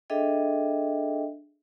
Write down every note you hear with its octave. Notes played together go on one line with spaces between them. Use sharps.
D4 G#4 A4 D#5 E5 G5